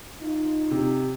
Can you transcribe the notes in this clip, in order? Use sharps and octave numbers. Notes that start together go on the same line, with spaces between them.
D#4 F4
C3